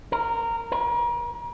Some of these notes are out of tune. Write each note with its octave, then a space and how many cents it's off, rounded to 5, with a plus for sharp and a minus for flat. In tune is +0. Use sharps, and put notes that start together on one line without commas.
A#4 -15
A#4 +40